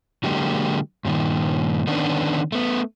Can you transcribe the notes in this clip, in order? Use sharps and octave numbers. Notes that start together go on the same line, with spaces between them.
D3 F#3 G#3 A#3 G4
G2 A#2 D#3
D3 D#3 B3 C#4 D4
A3 B3